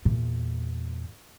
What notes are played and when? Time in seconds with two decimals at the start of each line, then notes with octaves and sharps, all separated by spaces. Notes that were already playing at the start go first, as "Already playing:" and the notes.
0.05 E2 A#2